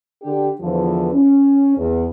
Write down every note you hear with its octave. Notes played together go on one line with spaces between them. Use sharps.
D3 D4 G4
E2 D3 E3 F3
C#4
E2